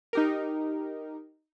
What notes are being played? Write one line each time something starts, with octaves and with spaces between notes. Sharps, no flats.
D#4 G4 A#4